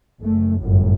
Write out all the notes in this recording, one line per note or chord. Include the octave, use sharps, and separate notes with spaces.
F#1 A3
G1 F#2 A2